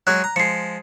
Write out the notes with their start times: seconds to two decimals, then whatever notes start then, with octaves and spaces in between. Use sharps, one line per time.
0.07 F#3 G#3 G#4 F#6
0.24 A#5
0.36 F3 G#3 C7 C#7